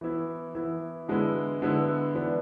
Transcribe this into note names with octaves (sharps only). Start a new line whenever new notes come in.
E3 B3 E4
E3 B3 E4
D3 G#3 B3 E4
D3 G#3 B3 E4
E3 B3 D4